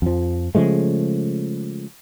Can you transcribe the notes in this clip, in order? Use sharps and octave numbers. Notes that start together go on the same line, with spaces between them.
F2 F3
C#3 F3 G#3 A3